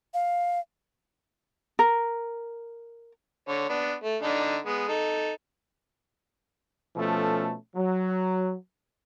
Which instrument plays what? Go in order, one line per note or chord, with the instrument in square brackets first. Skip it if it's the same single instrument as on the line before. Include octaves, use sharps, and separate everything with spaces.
[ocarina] F5
[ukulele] A#4
[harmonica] D3 C#5
B3 D4
A3
D3 D4 D#4
G#3 B3
D#4 A4
[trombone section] B2 F3 A3 C#4 A4
F#3